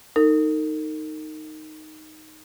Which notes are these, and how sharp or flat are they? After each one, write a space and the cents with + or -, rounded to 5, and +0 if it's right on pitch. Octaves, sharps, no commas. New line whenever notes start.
D#4 +0 A#4 -45